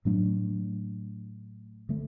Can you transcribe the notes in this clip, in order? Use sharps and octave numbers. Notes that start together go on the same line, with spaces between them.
A2 F#3 A3 D4
D3 A3